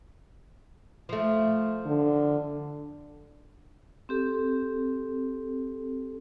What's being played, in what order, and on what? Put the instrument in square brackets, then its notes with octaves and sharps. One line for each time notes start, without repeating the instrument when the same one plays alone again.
[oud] F3 A3
[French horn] D3
[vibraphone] C4 G4 A4